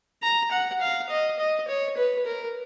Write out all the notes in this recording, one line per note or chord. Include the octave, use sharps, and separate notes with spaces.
A#5
F#5
F5
D#5
D#5
C#5
B4
A#4